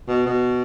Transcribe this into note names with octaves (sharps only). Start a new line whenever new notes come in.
B2
B2